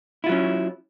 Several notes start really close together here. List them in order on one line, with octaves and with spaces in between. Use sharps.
E4 F4 F#3 C#4